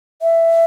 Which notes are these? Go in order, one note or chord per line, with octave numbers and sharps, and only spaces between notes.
E5